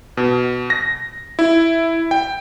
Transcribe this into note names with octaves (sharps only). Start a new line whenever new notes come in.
B2
A#6
E4
G5